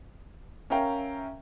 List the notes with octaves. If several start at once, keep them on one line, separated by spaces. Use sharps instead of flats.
C#4 A#4 E5 F5 G5 A#5